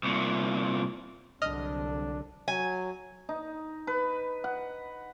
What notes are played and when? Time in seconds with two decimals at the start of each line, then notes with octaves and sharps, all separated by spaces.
0.03 C2 A#2
1.42 C2 D3 F#3 D4 D#5 F6
2.48 F#3 G#5
3.29 D#4
3.87 B4
4.44 F#5